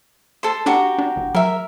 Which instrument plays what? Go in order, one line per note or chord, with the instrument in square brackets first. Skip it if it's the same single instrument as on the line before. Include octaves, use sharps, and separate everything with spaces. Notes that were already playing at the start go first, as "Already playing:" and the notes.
[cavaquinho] A4 C5
[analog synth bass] D4 [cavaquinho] F#4 G4 A#5
[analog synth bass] D4
G1
[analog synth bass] F#3 [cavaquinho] A#4 E5